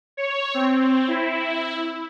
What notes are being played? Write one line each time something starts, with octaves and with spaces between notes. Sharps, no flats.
C#5
C4
E4